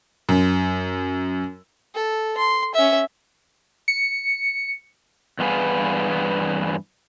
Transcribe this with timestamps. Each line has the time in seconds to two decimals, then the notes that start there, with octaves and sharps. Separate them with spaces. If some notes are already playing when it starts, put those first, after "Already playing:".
0.29 F#2
1.95 A4
2.38 C6
2.75 C#4 E5
3.88 C#7
5.39 E2 G2 B3 G#4 B4 F5